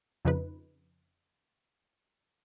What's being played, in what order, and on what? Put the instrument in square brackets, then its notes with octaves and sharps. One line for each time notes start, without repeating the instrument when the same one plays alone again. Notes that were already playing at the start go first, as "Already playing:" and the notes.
[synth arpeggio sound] F2 C#3 F3 D#4 B4